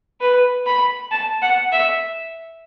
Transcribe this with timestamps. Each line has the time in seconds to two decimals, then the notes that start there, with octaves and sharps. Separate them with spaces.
0.21 B4
0.66 B5
1.11 A5
1.42 F#5
1.72 E5